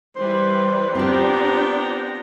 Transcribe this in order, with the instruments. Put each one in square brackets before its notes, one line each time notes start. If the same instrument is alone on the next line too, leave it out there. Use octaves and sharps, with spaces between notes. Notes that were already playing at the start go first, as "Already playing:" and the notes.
[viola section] E3 G3 B4 [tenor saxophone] C5
[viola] B3 A#5 [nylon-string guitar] C4 G4 [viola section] D4 F4 G5